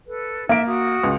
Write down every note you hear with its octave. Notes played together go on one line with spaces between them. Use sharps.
A4 B4
A#3 D#4 E5 D7
F#4 D#6
C#2